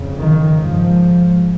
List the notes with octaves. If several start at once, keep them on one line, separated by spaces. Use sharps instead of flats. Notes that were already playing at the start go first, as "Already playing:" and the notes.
Already playing: F2 C#3
D#3
G#2 F3